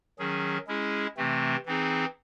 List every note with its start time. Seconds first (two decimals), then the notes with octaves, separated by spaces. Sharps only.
0.19 D#3 F#3 C#4 G#4
0.67 G#3 C#4 E4 G#4
1.17 C3 E3 A3 C4
1.66 E3 C4 D#4 G#4